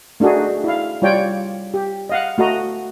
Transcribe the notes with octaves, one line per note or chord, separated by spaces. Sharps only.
A3 D4 D#4 F#4 G#4
E4 F5
G3 F4 C#5 D5 G5
G4
D#5 F5 F#5
A3 F#4 D#5 A#5